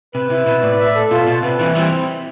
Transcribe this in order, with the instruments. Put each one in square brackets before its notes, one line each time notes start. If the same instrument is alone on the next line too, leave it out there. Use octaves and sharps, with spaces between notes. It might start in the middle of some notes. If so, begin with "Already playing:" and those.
[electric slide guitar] C3 [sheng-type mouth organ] B4
[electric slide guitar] C3 [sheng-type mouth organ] E4
[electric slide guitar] B2 [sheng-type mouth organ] B4
[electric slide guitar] A2 [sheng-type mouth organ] D5
[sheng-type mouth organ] E5
A4
[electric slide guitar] B2 [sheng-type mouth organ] F4
[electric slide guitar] B2 [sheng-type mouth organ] A5
[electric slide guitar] C3 [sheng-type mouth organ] B4
[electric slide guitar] C3 E3 [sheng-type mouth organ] E4
[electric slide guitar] E3 G3 [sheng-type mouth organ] C4